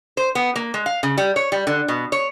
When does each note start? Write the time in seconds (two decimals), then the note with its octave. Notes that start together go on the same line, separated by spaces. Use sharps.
0.17 C5
0.35 B3
0.56 A#3
0.74 G#3
0.86 F5
1.03 C#3
1.18 G3
1.36 C#5
1.52 G3
1.67 D3
1.88 B2
2.12 C#5